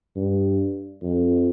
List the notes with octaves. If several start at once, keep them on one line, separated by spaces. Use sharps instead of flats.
G2
F2